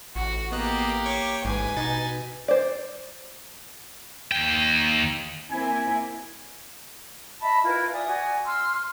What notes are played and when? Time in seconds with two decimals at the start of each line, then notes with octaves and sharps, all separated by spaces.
0.16 A1 F#4
0.52 A#3 B3 G4 D#5 F#6
1.06 C#5 C#6 D6
1.45 A1 G#2 B4 G#5
1.77 B2 D#4 A6
2.48 C5 D5
4.32 D#2 G5
5.50 A#3 C4 E4 G#5
7.41 D#5 E5 A5 B5
7.64 E4 F4 A#4 B4
7.92 D5 E5 G#5 D#6
8.07 F#4 D5 G#5
8.45 C6 E6 F6